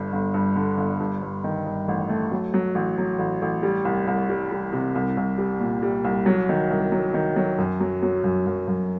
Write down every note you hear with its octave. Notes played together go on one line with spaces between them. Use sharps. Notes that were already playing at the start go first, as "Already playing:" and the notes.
Already playing: G1 G2
G1
G2
D3
G1
G2
G2
D#3
G2
A1
A3
F#3
F#3
A1
F#3
A1
A1
G3
C2
C2
G3
G3
C3
C2
C2
G3
A#2
G3
C2
F#3
D#3
C2
F#3
D#3
F#3
F#2
F#3
F#3
F#2
F#2
F#2